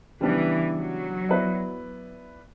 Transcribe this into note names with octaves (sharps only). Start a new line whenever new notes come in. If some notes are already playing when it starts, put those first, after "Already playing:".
C#3 E3 G3 B3 D4
F#3
B3 E4 B4 D5